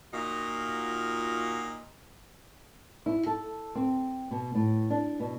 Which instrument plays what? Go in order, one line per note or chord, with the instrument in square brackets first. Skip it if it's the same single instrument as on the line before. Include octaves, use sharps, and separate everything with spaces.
[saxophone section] A#2 D#4 F4 F#4
[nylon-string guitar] E4
A4
C4
B2
A2
D4
B2